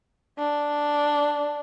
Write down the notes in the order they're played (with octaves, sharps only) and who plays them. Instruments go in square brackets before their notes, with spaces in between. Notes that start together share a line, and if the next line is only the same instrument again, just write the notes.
[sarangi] D4